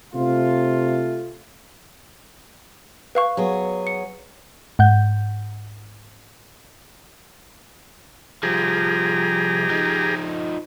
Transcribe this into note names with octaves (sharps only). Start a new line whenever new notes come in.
C3 A3 F4
B4 F5 C#6
F#3 B3 G#4
C#7
G#2 F#5 G6
C2 F3 G4 G#4 A#5
F3 D#4